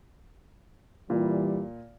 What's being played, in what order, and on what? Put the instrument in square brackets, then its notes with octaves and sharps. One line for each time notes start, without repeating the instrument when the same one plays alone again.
[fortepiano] A#2 [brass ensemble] E3 G3